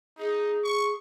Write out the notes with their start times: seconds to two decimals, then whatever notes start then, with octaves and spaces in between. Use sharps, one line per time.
0.18 D#4 G#4
0.64 C#6